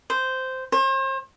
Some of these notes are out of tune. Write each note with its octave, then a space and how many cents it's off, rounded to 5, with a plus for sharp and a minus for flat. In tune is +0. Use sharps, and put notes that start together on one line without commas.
C5 -10
C5 +40